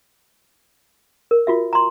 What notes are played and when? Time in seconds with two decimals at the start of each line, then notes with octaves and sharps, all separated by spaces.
1.31 A#4
1.47 F4 F#4 E5
1.73 A#5 C6